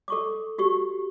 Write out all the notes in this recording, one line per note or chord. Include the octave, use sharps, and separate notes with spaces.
A4 C#6 D6
F#4 G4 C#6